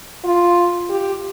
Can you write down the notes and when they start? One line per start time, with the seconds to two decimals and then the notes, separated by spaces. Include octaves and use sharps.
0.25 F4
0.90 G4